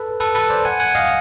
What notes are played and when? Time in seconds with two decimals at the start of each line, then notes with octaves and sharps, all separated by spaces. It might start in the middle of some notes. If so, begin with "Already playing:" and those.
Already playing: A4 B4
0.20 A4 B4
0.35 A4 B4
0.50 C5 D5
0.65 F#5 G#5
0.80 F#5 G#5
0.95 D#5 F5